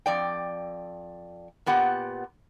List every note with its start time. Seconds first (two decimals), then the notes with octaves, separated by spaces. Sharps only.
0.06 F2 D5 G5
1.66 A#2 B3 G4 F#5